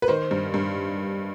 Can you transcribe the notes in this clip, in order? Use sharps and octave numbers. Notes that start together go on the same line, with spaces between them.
B4
D#3 C5
G2
G2